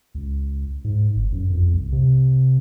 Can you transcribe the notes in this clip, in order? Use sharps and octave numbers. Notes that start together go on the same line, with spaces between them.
C#2
G#2
G1
F#2
F2
C2
C3